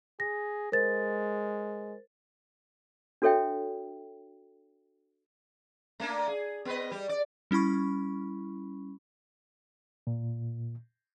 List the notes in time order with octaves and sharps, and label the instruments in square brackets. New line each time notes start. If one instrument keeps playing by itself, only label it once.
[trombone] G#4 [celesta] A#6
[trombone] G#3 [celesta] A#4 C5 A6
[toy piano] D4 F#4 A4 C#5 E5 G5
[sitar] A3 A#3 D4
G#4
B3 B4 D#5
G3
D5
[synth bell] G3 C#4 E4 B5 C#6
[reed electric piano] A#2